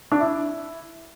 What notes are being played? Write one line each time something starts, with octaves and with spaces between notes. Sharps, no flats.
D4
E4